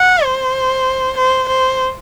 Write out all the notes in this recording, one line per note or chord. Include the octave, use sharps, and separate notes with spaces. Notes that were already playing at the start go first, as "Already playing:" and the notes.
Already playing: F#5
C5
C5
C5